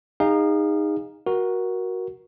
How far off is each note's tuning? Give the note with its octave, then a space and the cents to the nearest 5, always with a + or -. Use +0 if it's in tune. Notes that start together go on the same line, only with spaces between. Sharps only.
D#4 +0 G#4 -35 F5 +0
F#4 +0 A#4 +15